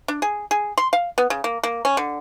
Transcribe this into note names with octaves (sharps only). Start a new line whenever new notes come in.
D4
G#4
G#4
C6
F5
B3
C#3
A#3
A#3
C#4
D3